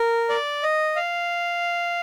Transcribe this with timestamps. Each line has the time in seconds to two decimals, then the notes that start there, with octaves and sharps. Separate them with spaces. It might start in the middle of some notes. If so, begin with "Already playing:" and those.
Already playing: A#4
0.29 D5
0.63 D#5
0.96 F5